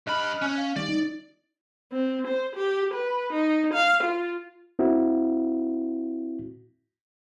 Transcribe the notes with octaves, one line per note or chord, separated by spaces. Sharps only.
G2 D#5 B5 F6 F#6
C#4
F5
D#3 G3 D5
D#4
C4
C5
G4
B4
D#4
F5
F4
C4 E4 F#4